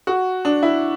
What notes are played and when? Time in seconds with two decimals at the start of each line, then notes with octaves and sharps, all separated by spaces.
0.07 F#4
0.45 D4
0.63 E4